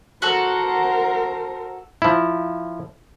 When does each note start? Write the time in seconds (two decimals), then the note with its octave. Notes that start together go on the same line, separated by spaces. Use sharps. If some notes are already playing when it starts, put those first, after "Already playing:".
0.22 F#4 A4 A#4 C5
2.02 F3 E4